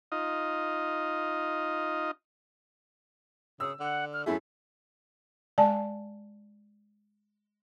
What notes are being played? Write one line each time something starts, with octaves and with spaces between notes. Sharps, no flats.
D#4 F4 D#5
C#3 D#6 E6
D3 F#5
F6
F#2 A3 E4 G#4 E5
G#3 D5 G#5 A5